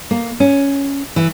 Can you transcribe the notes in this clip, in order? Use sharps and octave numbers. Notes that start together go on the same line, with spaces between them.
A#3
C#4
E3